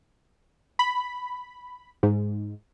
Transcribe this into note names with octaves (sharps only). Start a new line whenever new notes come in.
B5
G#2